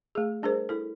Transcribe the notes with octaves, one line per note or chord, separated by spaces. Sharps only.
A3 G#4
G3 D4 G#4 A#4 C5
E4 A4